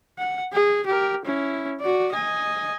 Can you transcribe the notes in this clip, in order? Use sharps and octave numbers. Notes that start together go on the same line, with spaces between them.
F#5
G#4
G4 A#4
C#4 E4
F#4 D5
D#5 G#5